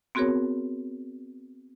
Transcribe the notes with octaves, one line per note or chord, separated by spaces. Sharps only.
B3 C4 F#4 G#4 A#4 C#5